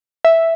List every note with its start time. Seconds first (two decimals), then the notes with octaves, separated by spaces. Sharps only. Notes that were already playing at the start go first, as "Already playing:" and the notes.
0.25 E5